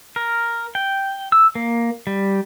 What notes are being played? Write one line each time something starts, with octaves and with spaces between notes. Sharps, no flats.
A#4
G5
E6
A#3
G3